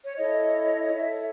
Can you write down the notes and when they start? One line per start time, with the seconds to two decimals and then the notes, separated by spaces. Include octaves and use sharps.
0.05 C#5
0.17 E4 A4 C#5 D#5
0.93 E4 A4 C#5 E5